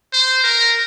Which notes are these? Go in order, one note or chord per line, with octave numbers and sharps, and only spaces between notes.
C5
A#4